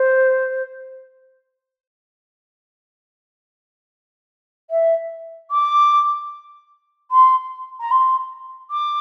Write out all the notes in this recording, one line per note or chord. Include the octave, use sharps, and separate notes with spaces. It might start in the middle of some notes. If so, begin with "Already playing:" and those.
Already playing: C5
E5
D6
C6
A#5
C6
D6